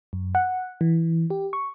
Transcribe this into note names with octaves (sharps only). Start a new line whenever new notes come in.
F#2
F#5
E3
G4
C#6